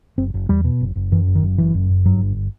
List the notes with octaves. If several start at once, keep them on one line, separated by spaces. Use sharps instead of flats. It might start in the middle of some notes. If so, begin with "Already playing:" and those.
F#1 C4
F#1
E2 G3
B2
F#1
F#1
F#2 E3
F#1
D#3
F#2
F#1 E3
F#2
F#1
G2 F#3
G1